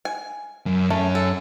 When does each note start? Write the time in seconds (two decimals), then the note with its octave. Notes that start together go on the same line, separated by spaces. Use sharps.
0.05 G#5
0.66 F#2
0.90 F#2 A3 C#4
1.15 A4